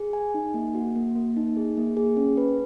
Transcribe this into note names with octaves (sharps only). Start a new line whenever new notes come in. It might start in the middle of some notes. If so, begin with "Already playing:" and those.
Already playing: G#4
G#5
D#4
A#3
F#4
A#3
A#3
D#4
G#4
A#3
G#4
C#4
B4